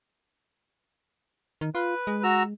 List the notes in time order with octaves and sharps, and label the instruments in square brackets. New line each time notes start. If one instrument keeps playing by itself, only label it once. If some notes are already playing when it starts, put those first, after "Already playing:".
[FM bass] D#3
[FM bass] F4 [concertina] B4
[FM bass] G#3
[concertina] F#4 A#5 E6